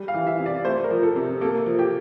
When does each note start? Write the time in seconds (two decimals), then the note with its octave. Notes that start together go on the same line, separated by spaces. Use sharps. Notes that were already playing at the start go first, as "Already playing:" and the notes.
Already playing: G3
0.08 F5
0.14 E3
0.27 E5
0.39 C3
0.46 D5
0.65 A3 C5
0.84 A#4
0.91 F3
1.03 A4
1.16 C3
1.41 A#3 A4
1.66 F3
1.79 G4